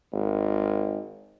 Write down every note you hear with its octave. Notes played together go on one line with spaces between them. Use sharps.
G#1